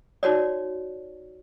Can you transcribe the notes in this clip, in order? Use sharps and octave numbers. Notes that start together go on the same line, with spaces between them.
D#4 F#4 C#5 D5